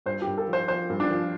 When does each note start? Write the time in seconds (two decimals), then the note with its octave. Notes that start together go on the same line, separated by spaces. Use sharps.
0.06 G2 C5
0.22 G4
0.27 G2
0.38 A4
0.48 F3
0.53 C5
0.68 F3 C5
0.90 G2
1.00 D4
1.11 F3